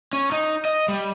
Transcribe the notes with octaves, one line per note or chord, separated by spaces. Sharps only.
C#4
D#4
D#5
G3